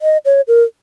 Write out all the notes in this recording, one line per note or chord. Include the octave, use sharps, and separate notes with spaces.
D#5
C#5
A#4